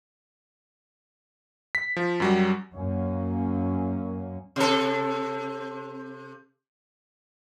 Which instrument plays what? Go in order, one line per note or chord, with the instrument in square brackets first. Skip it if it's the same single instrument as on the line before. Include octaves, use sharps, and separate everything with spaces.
[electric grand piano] B6
F3
F#2 F#3 G3
[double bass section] F#2 A#3 C#4
[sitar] C3 A4